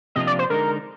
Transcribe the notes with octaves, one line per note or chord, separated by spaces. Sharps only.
C3 F3 A#3 D4 F4 D#5
D5
C5
D3 G#3 D#4 A#4